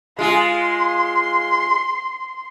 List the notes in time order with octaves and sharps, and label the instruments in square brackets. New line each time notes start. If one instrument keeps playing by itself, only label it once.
[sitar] G#3 F4 G#4 [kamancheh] C6